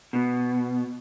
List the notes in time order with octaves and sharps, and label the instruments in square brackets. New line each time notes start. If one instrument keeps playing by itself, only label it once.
[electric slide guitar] B2